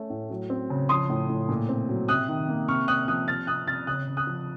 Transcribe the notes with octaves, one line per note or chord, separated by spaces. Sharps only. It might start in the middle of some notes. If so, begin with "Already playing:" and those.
Already playing: A3 C#4
A2
F#3
C4
C#3
F3 C6 D#6
A2
A2
A#2
C4
F#3
C3 D#6 F#6
D#3
A#3
C3 C#6 F6
C3 D#6 F#6
F3 D#6 F#6
C3 F6 A6
C3 D#6 F#6
C3 F6 A6
C#3 D#6 F#6
C#3
D#6 F#6
F3